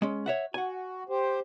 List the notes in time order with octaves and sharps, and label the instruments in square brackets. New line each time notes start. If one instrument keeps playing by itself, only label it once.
[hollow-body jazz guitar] G#3 C#4
C#5 E5 F#5
[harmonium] F#4 [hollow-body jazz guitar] F#5 G#5
[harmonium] G4 C5